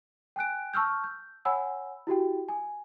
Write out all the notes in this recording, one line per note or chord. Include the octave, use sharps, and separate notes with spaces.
G5 G#5 F#6 D7
A5 C#6 E6 F6 G6
G6
C#5 F#5 G#5 B5 E6
E4 F#4 G4 G5
G#5